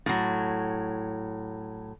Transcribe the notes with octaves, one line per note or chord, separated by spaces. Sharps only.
A2 F#3